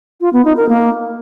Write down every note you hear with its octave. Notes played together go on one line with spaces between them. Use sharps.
F4
B3
D#4
A#4
A#3